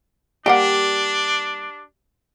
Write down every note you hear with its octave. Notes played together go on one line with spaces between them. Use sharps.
G3 A#3 D4 G4 F#5